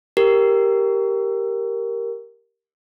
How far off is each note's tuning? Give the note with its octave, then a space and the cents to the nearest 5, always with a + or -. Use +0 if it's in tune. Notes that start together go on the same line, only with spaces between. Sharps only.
G4 +0 A#4 +0